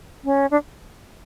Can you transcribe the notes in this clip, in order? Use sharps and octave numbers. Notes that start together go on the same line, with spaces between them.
C#4
D4